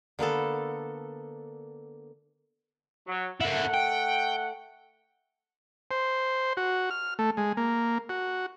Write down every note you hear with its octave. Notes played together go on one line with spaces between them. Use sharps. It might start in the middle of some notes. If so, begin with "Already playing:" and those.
D3 A#3 B3 A4
F#3
A3 A#3 E4 F#5
G5
C5
F#4
F6
A3
G#3
A#3
F#4